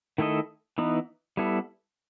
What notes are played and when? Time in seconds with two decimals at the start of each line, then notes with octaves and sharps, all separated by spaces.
0.18 D#3 A3 E4 A4 D#5
0.78 E3 B3 D#4
1.37 G3 B3 E4 A4